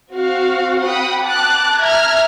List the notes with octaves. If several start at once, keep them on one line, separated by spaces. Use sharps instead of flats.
C4 F#4 F5
F#5 G5 B5 D#6
A5 D6 F#6
E5 A#5 F6 G#6